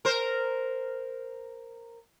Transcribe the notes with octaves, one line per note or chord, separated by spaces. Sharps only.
A#4 C5